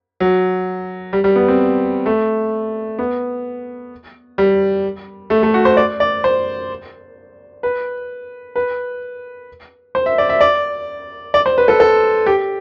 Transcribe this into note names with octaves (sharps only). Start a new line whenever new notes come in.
F#3
G3
G3
B3
C4
A3
B3
G3
A3
A3
F#4
C5
D5
D5
C5
B4
B4
C5
E5
D5
E5
D5
D5
C5
B4
A4
A4
G4